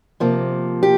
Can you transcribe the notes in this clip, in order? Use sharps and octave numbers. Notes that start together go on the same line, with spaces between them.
C3 F3 A#3
G4